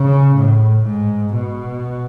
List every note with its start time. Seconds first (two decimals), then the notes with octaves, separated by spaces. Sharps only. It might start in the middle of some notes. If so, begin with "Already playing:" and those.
Already playing: C#3
0.36 A2
0.85 G#2
1.34 B2